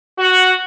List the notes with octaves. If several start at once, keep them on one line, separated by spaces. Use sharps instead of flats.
F#4